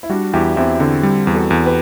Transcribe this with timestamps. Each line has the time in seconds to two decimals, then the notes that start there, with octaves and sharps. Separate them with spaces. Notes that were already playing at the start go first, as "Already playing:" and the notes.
0.03 E4
0.09 G3 D4 F#4
0.33 E2 E4 G4
0.56 E2 C4 E4
0.80 D3 C4 E4
1.03 G3
1.27 E2
1.35 F#4 A4
1.50 E2
1.66 G4 B4